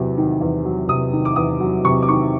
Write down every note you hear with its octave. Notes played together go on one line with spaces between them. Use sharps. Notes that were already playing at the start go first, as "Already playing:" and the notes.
Already playing: E2 C3 F#3
D#3
E2
F#3
C3 D#6
D#3
D6
E2 D#6
F#3
C3 C#6
D6
D#3 C#6